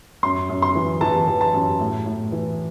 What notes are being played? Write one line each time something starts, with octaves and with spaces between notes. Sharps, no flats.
F#2 C6
F#2
C6
E3
E3 A5
E3
A5
F#2
A2
A2
E3